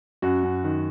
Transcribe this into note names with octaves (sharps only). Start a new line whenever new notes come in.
F#2 F#4
F#2
D#3